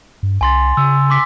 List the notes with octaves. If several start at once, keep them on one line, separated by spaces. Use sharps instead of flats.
G2
C2 G#5 C6 A6
C#3 E6
C6 D6 B6